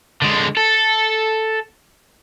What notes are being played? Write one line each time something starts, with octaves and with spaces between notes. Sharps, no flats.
D3 G#3
A4